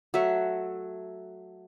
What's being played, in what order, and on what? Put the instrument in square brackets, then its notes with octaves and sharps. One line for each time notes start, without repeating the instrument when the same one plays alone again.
[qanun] F#3 A3 E5 F#5